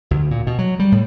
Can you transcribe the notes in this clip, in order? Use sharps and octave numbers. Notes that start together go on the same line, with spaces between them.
D2
A#2
B2
F#3
G3
A2